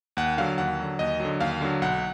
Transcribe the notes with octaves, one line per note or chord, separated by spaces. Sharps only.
D#2 F#5
D3 F#3 F5
D#2 F#5
D3 F#3
D#2 D#5
D3 F#3
D#2 F5
D3 F#3
B1 F#5